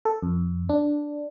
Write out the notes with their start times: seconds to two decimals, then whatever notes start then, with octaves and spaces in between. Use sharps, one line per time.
0.05 A4
0.23 F2
0.69 D4